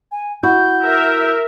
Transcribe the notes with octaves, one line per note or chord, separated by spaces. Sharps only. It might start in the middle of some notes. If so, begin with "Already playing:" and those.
G#5
E4 F#4 G6
A#4 E5